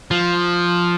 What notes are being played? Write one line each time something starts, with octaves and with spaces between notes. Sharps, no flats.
F3